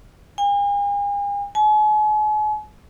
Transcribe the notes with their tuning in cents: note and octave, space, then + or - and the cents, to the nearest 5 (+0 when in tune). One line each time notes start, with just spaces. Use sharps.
G#5 -45
G#5 +40